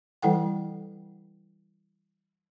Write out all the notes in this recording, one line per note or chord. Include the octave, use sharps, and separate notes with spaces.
E3 G3 E4 A4 F#5 G5